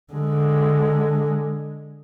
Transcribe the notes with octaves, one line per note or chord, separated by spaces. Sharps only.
D3 G#3